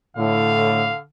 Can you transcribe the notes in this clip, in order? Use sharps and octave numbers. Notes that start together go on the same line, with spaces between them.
A2 D3 F5